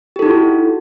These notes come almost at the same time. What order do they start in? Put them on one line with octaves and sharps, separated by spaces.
G4 A4 D#4 E4 F#4